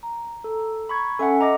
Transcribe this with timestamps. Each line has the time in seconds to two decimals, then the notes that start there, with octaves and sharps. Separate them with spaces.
0.03 A#5
0.44 A4
0.89 B5 C#6 G#6
1.19 C#4 A4 E5 F#5 G#5
1.41 D#5 A#5 D6 A#6